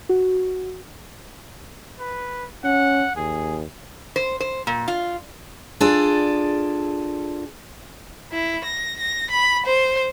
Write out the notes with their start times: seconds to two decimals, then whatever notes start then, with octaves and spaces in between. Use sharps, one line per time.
0.09 F#4
1.99 B4
2.64 C#4 F#5
3.16 D#2 G#4
4.16 C5
4.40 C5
4.67 A#2
4.88 F4
5.80 D4 F4 G#4 A4 D5
8.32 E4
8.64 A#6
9.00 A#6
9.31 B5
9.66 C5